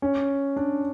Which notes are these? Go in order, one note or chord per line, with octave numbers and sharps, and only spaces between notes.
C#4
D4